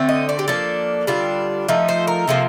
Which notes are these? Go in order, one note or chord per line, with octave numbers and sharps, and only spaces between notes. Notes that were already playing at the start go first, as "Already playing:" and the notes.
Already playing: D3 A3 C4
D#5
D5
G4
F3 A#3 D4 A4
D3 G3 D4 F4
F3 A3 D#4
C5
A#4
C3 F3 A#3 F4 A4